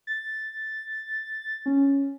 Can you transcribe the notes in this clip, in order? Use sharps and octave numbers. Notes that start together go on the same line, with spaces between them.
A6
C#4